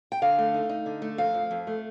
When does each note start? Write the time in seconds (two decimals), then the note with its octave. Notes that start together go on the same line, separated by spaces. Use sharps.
0.12 G5
0.22 D3 F5
0.38 A3
0.54 D#4
0.69 D#4
0.86 D3
1.02 A3
1.18 F2 F5
1.34 F3
1.51 F2
1.67 A3